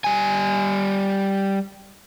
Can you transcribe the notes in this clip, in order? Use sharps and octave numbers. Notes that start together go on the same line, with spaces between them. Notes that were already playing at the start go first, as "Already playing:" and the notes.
G3 G#5